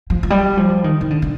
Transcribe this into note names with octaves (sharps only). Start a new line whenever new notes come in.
F3
F3
G3
F3
D#3
D#3
D3
D3